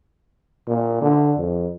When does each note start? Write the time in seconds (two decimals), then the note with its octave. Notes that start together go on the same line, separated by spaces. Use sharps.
0.68 A#2
1.01 D3
1.38 F2